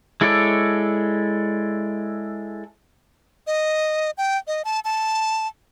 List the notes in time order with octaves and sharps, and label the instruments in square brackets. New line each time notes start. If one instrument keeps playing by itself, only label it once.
[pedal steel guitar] G#3 E4 A4 C#5 D5
[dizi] D#5
G5
D#5
A5
A5